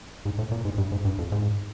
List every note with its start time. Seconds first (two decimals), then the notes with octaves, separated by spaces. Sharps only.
0.25 G#2
0.39 A2
0.52 A#2
0.65 G#2
0.78 G2
0.92 G#2
1.05 G2
1.19 F2
1.32 G#2